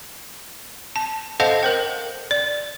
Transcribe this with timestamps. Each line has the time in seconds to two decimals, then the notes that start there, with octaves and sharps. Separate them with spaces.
0.96 A5
1.40 A4 C5 D#5 F5 F#5 A5
1.63 A#4 C5 G5
2.31 D5